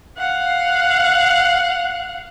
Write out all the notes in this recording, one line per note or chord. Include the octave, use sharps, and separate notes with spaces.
F5 F#5